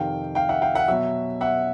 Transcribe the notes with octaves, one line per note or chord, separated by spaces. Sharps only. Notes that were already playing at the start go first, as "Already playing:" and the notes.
Already playing: F2 C3 D#3 F5 G5
F5 G5
E5 F#5
F5 G5
E5 F#5
B2 F#3 E5
E5 F#5